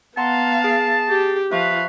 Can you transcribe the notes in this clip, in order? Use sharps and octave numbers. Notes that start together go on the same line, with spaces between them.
B3 F5 F#5 A5 A#5 C6
G#4 C7
G4
F3 B4 E5 F5 C#6